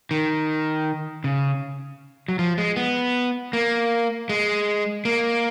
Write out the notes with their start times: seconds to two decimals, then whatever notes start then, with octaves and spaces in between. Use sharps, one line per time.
0.11 D#3
1.24 C#3
2.28 F#3
2.39 F3
2.58 G#3
2.76 B3
3.53 A#3
4.29 G#3
5.05 A#3